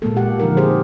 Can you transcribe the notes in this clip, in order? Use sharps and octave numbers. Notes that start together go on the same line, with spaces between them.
A#2 G#3 A#3 A4
A#3 G4 F#5
D3 F3 D#4 A#4
G4 G#4 C5